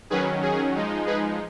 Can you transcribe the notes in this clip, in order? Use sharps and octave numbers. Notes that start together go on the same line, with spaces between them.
D#3 F#3 C#4 G#4 B4
G#4
F3 G#3 D#4
G#4 B4